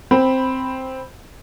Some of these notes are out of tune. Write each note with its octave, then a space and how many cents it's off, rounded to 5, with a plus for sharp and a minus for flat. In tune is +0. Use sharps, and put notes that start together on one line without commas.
C4 +0 B5 +0